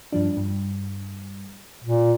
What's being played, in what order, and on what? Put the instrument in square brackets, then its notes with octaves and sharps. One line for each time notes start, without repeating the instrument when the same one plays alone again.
[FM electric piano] G2 F3 D4
G2
[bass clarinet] A#2